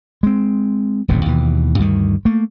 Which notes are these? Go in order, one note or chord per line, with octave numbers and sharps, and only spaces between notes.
G#3 C4
D#1 A1 F2 C3
D#2 B2 E3
D2 G2 D#3
A3 A#3